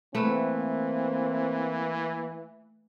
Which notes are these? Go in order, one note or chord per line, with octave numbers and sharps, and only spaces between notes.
E3 A3 A#3 C4 B4